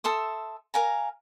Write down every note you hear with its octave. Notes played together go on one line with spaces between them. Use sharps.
A4 E5 C6 D#6
A#4 F5 G#5 A#5